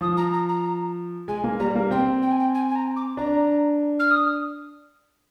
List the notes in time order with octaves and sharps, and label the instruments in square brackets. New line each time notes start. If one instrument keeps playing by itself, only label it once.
[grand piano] F3 [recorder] D#6
[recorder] A#5
A#5
A#5
[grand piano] G#3 [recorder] G#5
[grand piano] A#3
[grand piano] G3 [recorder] A#5
[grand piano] A#3
[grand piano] C4 [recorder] G5
[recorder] G5
G#5
G5
G#5
G#5
A#5
D6
[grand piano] D4 [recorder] A#5
[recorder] F6
D#6